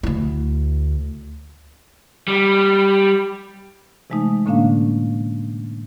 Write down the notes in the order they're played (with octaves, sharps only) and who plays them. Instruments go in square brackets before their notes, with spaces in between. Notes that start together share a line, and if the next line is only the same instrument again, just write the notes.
[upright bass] D2 E4
[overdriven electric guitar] G3
[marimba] C3 E3 G#3 A3 D#4
A2 D3 A#3 C#4 D4 F5